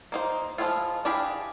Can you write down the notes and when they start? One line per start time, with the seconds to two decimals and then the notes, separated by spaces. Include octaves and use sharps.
0.12 A#3 D#4 C5
0.58 F3 F#3 G#3 E4 F4
1.05 D4 E4 G4 G#4 F5